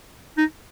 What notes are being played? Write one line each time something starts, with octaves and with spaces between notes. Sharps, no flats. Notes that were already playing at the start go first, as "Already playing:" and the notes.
D#4